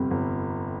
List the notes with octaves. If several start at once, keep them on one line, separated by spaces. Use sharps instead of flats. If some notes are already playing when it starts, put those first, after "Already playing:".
Already playing: G1 F2 C3 G3
G1